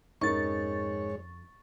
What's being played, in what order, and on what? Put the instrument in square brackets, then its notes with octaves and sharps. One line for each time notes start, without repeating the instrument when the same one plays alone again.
[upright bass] F2 C#4 [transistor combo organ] G#2 C#5 [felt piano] D#4 A#4 [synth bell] C#6 A6